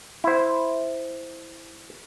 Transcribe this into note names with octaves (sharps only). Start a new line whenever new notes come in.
E4 C5